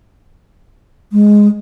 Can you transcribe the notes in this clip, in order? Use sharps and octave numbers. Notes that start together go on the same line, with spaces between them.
G#3